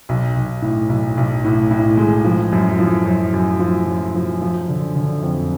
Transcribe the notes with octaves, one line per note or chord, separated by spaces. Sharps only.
B1
B1
A2
B1
B1
A2
A2
G#3
F3
F#2
F3
F#2
F#2
F3
F#2
F3
F3
D3
D3
F2